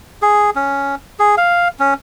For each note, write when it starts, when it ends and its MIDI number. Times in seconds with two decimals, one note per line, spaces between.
0.22 0.50 68
0.56 0.95 61
1.19 1.35 68
1.37 1.68 77
1.79 1.94 61